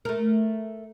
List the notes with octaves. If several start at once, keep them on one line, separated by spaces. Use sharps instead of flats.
A3 A#4